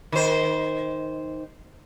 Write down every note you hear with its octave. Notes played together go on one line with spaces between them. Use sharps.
D#3 C5